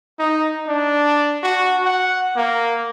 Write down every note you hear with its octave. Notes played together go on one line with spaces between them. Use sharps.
D#4
D4
F#4
F#5
A#3